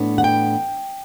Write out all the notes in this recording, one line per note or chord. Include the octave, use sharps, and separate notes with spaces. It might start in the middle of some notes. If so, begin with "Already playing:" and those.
Already playing: A2 E3 B3 D4
F#5
G5